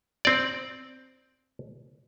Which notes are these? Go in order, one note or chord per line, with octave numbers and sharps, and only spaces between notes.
C4 D5